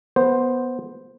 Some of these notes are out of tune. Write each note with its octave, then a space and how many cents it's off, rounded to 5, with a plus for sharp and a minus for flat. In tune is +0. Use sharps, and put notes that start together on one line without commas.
B3 -5 C5 +0